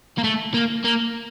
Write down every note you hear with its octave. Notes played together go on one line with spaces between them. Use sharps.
A#3
A3
A#3
A#3